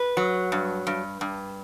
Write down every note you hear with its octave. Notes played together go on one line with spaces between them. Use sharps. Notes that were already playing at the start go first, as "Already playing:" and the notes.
Already playing: B4
F#3
G2
G2
G2